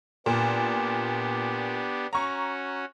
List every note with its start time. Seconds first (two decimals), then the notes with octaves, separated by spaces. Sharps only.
0.26 A#2 B3 D4 G4
2.13 C#4 F#4 A#5 C#6